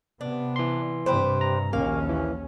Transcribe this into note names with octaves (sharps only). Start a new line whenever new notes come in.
C3 B3 D4
E3 C6
G2 C3 G4 B4 C5
A#5
A#1 D#2 A#3 C#4 F5
E3